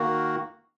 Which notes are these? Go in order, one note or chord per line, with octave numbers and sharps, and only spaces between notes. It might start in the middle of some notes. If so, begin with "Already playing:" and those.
Already playing: D#3 A#3 F#4